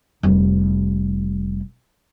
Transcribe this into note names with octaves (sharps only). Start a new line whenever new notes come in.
F1 G3